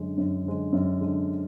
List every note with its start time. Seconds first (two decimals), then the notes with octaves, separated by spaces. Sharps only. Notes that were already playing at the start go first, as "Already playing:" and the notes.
Already playing: F#2 D3 G#3
0.17 F#2
0.45 D3 G#3
0.73 F#2
1.01 D3 G#3